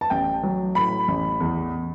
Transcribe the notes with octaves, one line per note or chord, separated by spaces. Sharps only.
A5
A1 G5
F#3
A2 B5
A1
E2